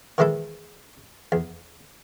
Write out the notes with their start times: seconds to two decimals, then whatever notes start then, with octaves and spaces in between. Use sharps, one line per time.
0.18 D#3 E3 G#3 E4 A4
1.32 E2